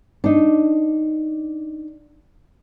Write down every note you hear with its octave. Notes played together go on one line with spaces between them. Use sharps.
D4 D#4